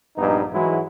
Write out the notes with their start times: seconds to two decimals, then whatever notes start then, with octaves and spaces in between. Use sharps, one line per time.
0.17 A#1 G2 B3 D#4
0.53 G#2 E3 F#3 G#3 E4 F#4